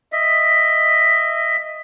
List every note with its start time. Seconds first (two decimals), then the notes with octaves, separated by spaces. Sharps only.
0.12 D#5 E5